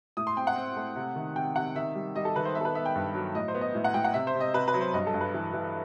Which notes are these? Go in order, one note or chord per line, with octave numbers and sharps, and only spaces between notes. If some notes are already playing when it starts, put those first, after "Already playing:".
A2 D#6
C6
C4 G5
F#5
C4
A3
C3
D#3
C3 G5
C3 F#5
D#3 E5
G3
G3 D#5
A4
D#3 B4
C5
B3 E5
A4
B4
B3 E5
G5
G2
F#3
A2 D#5
C5
B3
D#5
A2
F#5
A2 G5
F#5
C3 E5
C5
C3
D#5
C3 B4
B4
F#3
C5
G2 D#5
A4
G2
B4
E3
E3